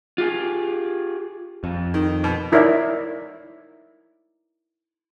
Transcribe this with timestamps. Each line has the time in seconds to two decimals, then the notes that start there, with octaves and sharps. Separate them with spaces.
0.18 F4 G4 G#4
1.64 F2
1.94 D#3
2.24 B2
2.52 D#4 E4 A#4 C#5 D5 E5